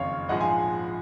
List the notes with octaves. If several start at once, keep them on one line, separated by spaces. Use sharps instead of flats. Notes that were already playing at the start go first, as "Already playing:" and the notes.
Already playing: F#1 F2 D#3 C#5 F5
A#1 G#2 F3 G#3 D#5 F#5
F5 G#5